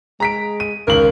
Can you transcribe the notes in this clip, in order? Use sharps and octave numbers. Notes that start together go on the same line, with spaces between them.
G#3 A#5 B6 D7
D#7
G#1 C#2 A#4 F#7